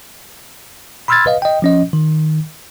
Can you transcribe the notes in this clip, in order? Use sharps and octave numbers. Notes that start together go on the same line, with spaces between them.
B5 C6 E6 F6 G#6 A6
B4 D#5 F5
D#5 G5
F3 C#4 D#5
D#3